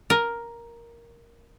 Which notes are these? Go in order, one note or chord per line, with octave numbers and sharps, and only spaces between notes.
A#4